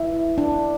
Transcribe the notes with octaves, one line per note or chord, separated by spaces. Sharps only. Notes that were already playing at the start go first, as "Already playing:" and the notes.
Already playing: E4
D4